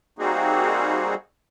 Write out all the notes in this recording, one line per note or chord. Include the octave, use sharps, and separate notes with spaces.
G3 A#3 C4 D#4 F#4 G#4